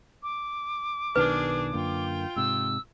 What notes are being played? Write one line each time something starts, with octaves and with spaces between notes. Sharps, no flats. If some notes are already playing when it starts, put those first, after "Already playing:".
D6
B1 B2 D#3 D4 G#4 B4
F#2 D3 A#3 F4 G5
G#2 C3 E6